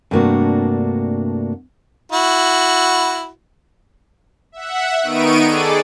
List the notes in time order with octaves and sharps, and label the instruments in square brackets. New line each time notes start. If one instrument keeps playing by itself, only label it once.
[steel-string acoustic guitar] G2 C3 A3 A#3 D4 F#4
[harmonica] E4 F#4
[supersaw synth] E5 F#5
D#3 B3 D#4 C#6 D7 D#7
G#4 A4 D5